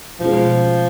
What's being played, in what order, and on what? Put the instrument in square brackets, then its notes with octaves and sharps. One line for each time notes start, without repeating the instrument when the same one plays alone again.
[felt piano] B2 G#3 C#4 F4 G#4 [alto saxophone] F3